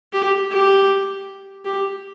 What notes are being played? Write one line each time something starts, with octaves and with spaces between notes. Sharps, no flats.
G4
G4
G4